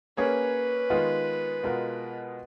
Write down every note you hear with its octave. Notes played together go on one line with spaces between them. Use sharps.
A#3 C#4 G#4 B4 C#5
D#3 G#3 B3 F4
B2 G#3 B3 F4 A#4